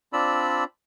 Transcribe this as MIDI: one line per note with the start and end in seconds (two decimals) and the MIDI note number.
0.13 0.64 60
0.13 0.64 62
0.13 0.64 65
0.13 0.64 74
0.13 0.64 83
0.13 0.64 88